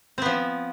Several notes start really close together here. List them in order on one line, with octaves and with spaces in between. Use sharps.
C4 B3 F3